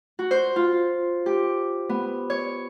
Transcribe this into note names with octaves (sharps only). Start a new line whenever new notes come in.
F#4
C5
F4
G4
B3
C#5